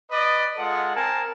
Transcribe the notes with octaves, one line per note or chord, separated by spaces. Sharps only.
B4 D5 D#5
G#3 F4 A4 F#5
C4 A#4 G#5 A5